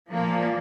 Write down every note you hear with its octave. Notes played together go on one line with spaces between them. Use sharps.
A#2 F3 A#3